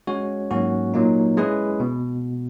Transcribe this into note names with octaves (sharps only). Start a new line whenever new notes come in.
G#3 C#4 F#4 C#5
G#2 F#3 A#3 C#4 F#4
A#2 F#3 A#3 D#4
G#3 C#4 E4 G#4 B4
B2